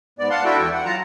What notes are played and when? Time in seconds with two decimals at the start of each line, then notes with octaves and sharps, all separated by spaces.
0.19 G#2 B3 D5
0.30 F5 F#5 A5 C6
0.45 D4 E4 F#4 A4 E5 G5
0.58 E2 E3 G5
0.73 F#5
0.85 F#3 F4 A5 A#5